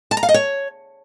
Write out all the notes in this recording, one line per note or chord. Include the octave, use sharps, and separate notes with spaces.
A5
A#5
F5
D#5
C#5